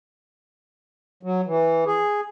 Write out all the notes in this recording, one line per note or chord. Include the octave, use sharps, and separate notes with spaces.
F#3
E3
G#4